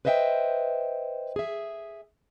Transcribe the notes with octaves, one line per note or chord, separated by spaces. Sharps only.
B4 C5 D#5 E5 F#5 G5
G#4 E5